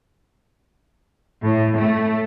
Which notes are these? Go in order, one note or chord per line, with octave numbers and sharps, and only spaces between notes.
A2
A3